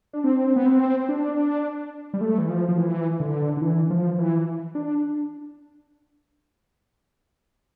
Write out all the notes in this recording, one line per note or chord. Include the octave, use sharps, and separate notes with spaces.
D4
C4
B3
C4
D4
G3
A3
E3
F3
F3
E3
D3
D3
E3
F3
E3
D4